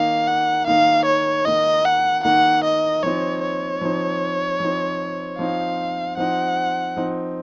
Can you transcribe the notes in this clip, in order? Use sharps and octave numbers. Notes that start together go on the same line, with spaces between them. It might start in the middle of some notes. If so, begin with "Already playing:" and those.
Already playing: D#3 A#3 D#4 F5
F#5
D#3 A#3 D#4 F5
C#5
D#3 A#3 D#4 D#5
F#5
D#3 A#3 D#4 F#5
D#5
F3 C4 D#4 C#5
C#5
F3 C4 D#4
F3 C4 D#4
F3 C4 D#4 F5
F3 C4 D#4 F#5
F3 C4 D#4